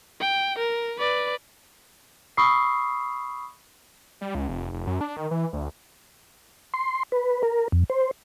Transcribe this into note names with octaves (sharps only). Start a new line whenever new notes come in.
G5
A#4
B4 D5
B5 C#6 D#6 E6 C7
G3
C#2
F1
F1
F#2
D4
D#3
E3
D2
C6
B4
A#4
F2
C5